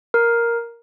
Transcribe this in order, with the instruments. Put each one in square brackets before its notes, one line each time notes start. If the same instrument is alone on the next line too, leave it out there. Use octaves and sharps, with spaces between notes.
[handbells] A#4